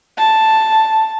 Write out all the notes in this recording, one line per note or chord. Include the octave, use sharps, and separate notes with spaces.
A5